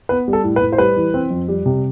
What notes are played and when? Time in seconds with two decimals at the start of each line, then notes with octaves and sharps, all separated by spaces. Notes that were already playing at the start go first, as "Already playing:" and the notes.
0.09 B3 B4
0.28 G3
0.33 A4
0.44 A2
0.56 B4
0.62 A2
0.73 C5
0.78 G3 B4
0.96 E3
1.14 C4
1.30 F2
1.48 G3
1.66 C3